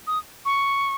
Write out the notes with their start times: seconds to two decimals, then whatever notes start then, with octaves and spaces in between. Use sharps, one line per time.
0.07 D#6
0.45 C#6